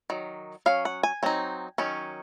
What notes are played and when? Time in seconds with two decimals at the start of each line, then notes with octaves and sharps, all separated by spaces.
0.10 D#3 F#3
0.66 F#3 C#4 F5
0.85 F#5
1.03 G#5
1.23 F#3 C4 D#4
1.78 D#3 F#3 C#4